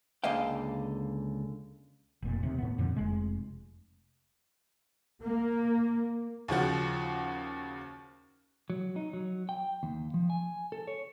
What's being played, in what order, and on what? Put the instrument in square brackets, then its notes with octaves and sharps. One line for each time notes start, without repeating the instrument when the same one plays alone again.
[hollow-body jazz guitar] C#2 D3 A#3 D#5 F5 G5
[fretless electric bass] F1 A#2
D#2 C3
A2 B3
F2 A#2 D3 F3
F1 G#3
[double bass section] A#3
[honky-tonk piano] D#2 C#3 F3 F#4
[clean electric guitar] F#3
D#4
F#3
G5
D#2
F3
G#5
A4
C#5